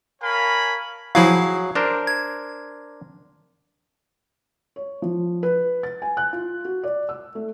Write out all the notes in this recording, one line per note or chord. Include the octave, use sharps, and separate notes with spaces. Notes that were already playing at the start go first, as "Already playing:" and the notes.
A#4 C#5 F5 G#5 A5 B5
F3 F#3 E4 G#4 F5
D4 A#4 C5
G#6
C#5
F3
B4
A6
G#5
F#6
F4
F#4
D5
E6
A3